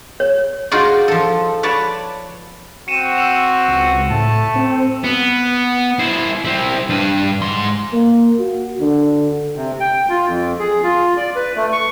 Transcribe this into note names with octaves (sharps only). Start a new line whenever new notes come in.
C#5
D#4 F4 F#4 G#4 D5
F3 A4
B4 C#5 D5 A5
C4 F#4 C#7 D#7 E7
E6 C#7 F7
C#2
A2 A3 A5
C4
B3
E4 C5
C4 E4
G2 B4
G#2 C6
A#3
F#4
D3
C3
G5
F4
F2
G#4
F4
D5
B4
A3
C#6